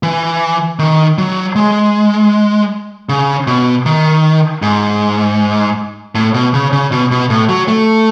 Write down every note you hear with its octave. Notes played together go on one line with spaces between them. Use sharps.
E3
D#3
F#3
G#3
C#3
B2
D#3
G#2
A2
B2
C#3
C#3
B2
B2
A2
F#3
A3